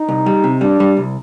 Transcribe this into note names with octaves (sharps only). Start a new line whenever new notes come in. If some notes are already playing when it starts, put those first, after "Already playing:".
Already playing: D#4
C2
G3
C3
G3 D4
G3
C2